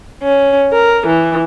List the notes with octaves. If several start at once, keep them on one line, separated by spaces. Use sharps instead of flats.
C#4
A#4
E3